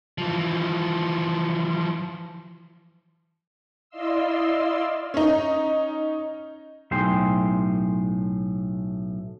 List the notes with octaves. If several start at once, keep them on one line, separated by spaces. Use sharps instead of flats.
E3 F3
E4 D5 D#5 F5 C6 E6
C#4 D#4
B1 A2 G#4 G5 C6